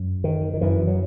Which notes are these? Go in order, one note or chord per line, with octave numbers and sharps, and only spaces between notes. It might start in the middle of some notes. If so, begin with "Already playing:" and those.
Already playing: F#2
D#3
D#3
F#2 E3
F#3